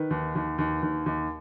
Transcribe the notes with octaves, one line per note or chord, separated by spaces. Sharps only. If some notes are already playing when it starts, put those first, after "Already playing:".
Already playing: D#3 B4
D#2
D#2
D#2
D#2
D#2